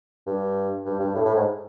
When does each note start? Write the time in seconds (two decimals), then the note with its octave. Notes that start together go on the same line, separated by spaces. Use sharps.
0.27 G2
0.86 G2
1.00 G2
1.15 A2
1.25 A2
1.35 G#2